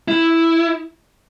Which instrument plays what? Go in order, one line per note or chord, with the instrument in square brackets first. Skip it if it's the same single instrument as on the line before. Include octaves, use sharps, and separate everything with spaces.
[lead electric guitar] E4